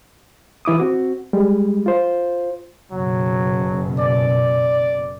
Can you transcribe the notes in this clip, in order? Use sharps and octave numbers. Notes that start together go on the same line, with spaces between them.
E3 E4 D6 D#6
C4 F#4
G3 G#3
F4 C5
F#1 B2 F#3
D5